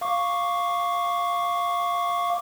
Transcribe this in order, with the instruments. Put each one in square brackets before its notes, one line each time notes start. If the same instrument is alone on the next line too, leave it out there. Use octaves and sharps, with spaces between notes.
[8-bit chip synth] F5 C#6 D6